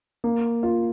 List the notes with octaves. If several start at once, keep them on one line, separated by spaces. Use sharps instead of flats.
A#3
F4